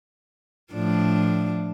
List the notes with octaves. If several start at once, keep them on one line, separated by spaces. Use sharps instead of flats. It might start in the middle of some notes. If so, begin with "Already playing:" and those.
A2 F3 D4